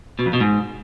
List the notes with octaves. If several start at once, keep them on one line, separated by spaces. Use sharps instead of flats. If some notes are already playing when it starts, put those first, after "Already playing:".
B2
F2
B2
G#2